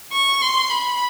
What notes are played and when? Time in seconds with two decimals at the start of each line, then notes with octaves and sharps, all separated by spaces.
0.12 C#6
0.42 C6
0.70 B5